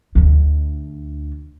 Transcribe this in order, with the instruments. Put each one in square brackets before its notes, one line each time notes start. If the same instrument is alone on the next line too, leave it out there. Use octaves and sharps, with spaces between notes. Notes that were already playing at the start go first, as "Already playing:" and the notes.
[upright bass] D2 D3